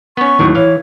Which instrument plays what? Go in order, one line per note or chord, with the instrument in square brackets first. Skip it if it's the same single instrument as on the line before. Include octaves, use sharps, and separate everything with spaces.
[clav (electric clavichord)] B3 C#4 [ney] C#6
[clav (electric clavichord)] D#2 A2 F#3
[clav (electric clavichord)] E3 F5 [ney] C#5